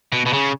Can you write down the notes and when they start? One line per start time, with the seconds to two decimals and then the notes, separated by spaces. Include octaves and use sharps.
0.12 B2
0.26 B2
0.33 C#3